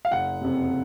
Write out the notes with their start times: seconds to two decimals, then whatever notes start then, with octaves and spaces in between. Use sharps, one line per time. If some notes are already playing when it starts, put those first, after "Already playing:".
0.05 F5
0.11 F#1 F#5
0.41 F2 C3